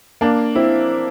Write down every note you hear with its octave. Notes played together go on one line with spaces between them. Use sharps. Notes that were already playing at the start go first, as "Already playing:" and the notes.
A#3 D4
C4 E4